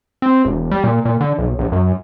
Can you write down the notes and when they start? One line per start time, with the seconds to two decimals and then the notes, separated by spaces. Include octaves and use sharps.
0.22 C4
0.45 E1
0.71 G3
0.84 A#2
1.05 A#2
1.21 D3
1.38 B1
1.59 A#1
1.72 F#2